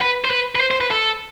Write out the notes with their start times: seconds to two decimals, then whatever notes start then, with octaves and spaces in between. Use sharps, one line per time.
0.01 B4
0.24 C5
0.30 B4
0.55 B4
0.61 C5
0.71 C5
0.81 B4
0.91 A4